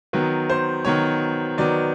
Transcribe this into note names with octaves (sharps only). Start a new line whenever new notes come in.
D#3 F#3 B3 B4
C5
D#3 F#3 B3 C#5
D#3 F#3 B3 D5